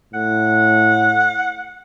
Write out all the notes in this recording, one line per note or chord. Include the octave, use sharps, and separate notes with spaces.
A2 F#5